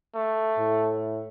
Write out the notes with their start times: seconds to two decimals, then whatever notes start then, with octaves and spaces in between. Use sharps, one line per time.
0.16 A3
0.58 A2